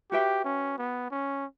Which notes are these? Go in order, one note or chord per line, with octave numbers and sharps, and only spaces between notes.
F#4 G4 B4 E5 G5
C#4
B3
C#4